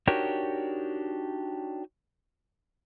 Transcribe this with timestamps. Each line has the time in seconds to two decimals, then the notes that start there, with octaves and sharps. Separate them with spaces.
0.07 D4 D#4 F#4 G4 A#4 C#5